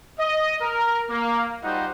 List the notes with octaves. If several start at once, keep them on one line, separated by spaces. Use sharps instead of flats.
D#5
A#4
A#3
G3 D#4 F4 F#4 C5 F#5